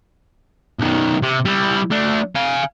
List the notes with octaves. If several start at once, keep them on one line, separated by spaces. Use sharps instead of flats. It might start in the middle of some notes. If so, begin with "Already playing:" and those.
B1 D#3
C3
G3 E4
A3 D4
F5 G#5